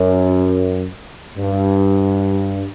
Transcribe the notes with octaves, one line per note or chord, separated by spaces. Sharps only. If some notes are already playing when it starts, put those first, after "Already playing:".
Already playing: F#2
G2